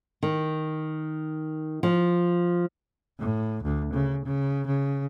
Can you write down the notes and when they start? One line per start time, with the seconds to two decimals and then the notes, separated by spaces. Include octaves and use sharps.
0.23 D#3
1.83 F3
3.20 A2
3.64 D2
3.93 C#3
4.25 C#3
4.67 C#3